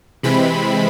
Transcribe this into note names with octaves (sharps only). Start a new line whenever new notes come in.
C3 E3 G#3 C4 B5